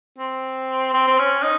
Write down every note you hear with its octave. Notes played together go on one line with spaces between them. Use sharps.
C4
C4
C4
C#4
D#4